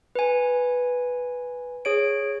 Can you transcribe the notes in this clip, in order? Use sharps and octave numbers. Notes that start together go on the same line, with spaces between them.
B4 G#5
G#4 C#5 D7